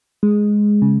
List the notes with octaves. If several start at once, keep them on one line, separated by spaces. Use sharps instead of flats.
G#3
C#3